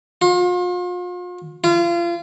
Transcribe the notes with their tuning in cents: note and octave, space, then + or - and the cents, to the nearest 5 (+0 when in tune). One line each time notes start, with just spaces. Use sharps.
F4 +40
F4 -30